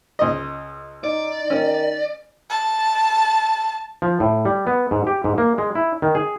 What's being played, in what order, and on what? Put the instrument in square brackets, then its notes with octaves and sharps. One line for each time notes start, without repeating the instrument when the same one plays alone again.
[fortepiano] C#2 D#5
[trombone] D#4 [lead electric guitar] D5
[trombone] D#3 [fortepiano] C#4
[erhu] A5
[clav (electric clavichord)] F3
A2
G3
B3
G#2
G4
G#2
A#3
G#3
E4
D#3
G#4